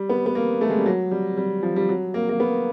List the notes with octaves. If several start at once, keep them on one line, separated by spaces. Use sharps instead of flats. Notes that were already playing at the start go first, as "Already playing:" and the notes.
Already playing: G3
B3
B3
A#3
A3
G#3
G3
F#3
G3
G3
F3
G3
F#3
A#3
A#3
B3